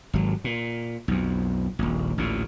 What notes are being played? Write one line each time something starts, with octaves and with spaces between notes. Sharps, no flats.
G#1 F#3
A#2
B1 F2
D#1 A#1
A1 D2 A#2